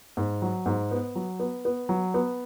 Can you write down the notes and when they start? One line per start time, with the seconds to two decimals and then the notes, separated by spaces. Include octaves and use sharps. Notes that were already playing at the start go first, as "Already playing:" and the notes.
0.17 G#2
0.42 F#3
0.66 G#2
0.91 B3
1.16 F#3
1.40 B3
1.65 B3
1.89 F#3
2.14 B3